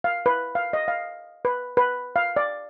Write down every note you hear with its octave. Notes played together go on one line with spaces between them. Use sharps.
F5
B4
F5
D#5
F5
B4
B4
F5
D5